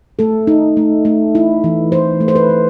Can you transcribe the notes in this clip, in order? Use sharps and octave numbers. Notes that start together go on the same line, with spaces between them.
A3 A4
D#4
A3
A3
E4
E3
E3 C5
A3
C5
B4
A3